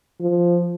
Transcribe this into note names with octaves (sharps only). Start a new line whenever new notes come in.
F3